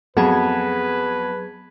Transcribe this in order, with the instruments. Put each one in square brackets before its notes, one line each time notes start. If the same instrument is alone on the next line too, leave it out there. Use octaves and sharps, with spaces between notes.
[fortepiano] F2 [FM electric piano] F#3 G#4 G#6 [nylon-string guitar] B3 [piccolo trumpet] B4